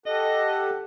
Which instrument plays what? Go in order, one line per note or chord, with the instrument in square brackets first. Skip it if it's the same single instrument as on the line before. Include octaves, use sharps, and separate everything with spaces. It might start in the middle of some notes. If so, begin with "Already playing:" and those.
[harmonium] G4 A4 F#5 [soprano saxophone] D#5